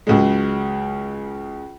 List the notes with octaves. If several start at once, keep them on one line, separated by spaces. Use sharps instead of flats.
C#2 C#3 F#3 G#3